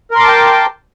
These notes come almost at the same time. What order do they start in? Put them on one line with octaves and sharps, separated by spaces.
A#4 C6 D6 A5 G5